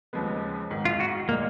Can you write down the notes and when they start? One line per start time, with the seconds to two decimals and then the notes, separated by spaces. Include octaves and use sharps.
0.13 D#2 C#3 F3 G#3 B3
0.71 G#1 G#2 D#3
0.85 F4
1.00 F#4
1.29 A#2 G#3 A#3 D#4